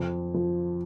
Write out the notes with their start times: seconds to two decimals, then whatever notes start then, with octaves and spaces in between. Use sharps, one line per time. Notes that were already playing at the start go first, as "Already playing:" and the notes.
Already playing: F2
0.34 F3